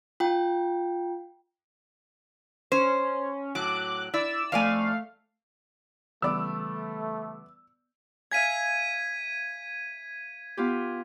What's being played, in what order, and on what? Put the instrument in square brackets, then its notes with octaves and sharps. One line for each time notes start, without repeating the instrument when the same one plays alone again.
[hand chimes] F4 G5
[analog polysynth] C#4 [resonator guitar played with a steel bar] C5
[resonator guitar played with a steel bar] A2 F#3 [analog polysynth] D6 F#6
[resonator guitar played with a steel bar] E4 [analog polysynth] D5 E6
[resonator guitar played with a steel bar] F2 D5 G#5 [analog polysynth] A3 F5
[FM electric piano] C#3 E3 G3 [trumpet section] A3 [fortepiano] B3 D5 [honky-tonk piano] E6
[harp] E5 F5 G#5 [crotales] G#6 B6 D#7
[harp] B3 F4 G4